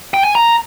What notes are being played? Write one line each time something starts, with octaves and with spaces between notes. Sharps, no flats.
G5
G#5
A#5